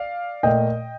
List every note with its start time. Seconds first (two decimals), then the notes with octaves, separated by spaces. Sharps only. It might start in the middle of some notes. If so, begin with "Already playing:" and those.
Already playing: D5 F5
0.43 A#2 A3 D#5 G5